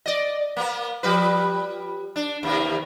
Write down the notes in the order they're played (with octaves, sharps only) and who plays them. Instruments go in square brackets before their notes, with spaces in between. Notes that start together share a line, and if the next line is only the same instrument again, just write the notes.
[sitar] D5 D#5
A#3 B3
F3 G3 B4
D4
D#2 C3 A#3